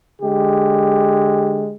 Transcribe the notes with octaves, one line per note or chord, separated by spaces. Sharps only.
D3 G#3 G4